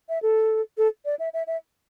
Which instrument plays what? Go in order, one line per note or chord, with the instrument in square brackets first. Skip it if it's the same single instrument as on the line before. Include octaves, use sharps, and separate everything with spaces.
[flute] E5
A4
A4
D5
E5
E5
E5